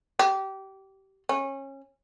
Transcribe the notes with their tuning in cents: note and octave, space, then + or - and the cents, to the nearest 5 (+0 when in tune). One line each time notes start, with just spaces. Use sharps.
G4 -25
C#4 -25